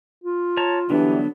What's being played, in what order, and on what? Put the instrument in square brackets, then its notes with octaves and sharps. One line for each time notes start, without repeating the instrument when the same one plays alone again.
[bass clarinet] F4
[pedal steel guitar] C#5 A5 A#5
[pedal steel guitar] D3 F#3 B3 [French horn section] E3 G3 [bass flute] D4